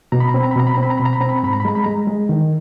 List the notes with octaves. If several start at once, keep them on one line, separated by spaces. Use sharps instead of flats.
B2 A#5
B5
A#5
C4 B5
A#5
B5
B2 A#5
B5
A#5
C4
B5
A#5
B2 B5
A#5
B5
C4 A#5
B5
A#5
G#2 B5
A#5
B5
G#3 A#5
B5
G#3 A#5
G#3
D#3